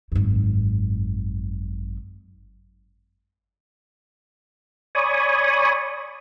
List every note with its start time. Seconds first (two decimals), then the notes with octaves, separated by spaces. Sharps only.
0.12 G#1 F#2
4.95 C#5 D5 G#5 B5 C#6 D#6